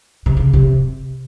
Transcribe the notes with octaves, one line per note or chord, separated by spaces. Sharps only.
C3
C#3
C3